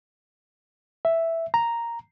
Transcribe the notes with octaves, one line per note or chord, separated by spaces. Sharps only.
E5
A#5